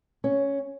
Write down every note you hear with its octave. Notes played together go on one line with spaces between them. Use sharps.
C#4